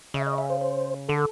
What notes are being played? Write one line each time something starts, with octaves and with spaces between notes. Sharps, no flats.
C#3 E5
D#5
E5
C5
C5
D3 A4